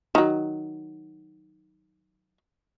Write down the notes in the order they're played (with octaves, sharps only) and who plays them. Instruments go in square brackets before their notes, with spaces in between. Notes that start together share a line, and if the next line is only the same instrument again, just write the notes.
[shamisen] D#3 F#3